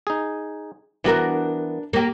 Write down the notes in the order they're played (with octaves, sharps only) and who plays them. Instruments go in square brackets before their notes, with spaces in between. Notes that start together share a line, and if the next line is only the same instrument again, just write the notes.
[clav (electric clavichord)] D#4 G#4
[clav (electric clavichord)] E3 B3 [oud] D4 F#4 A#4
[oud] A#3 G4